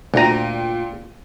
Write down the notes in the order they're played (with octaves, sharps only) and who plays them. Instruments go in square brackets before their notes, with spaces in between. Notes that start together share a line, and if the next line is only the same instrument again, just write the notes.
[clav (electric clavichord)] D2 A#5 [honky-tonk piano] A#2 G5 D#7